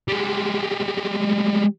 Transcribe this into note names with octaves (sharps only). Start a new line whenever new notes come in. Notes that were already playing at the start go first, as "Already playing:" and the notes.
G3 G#3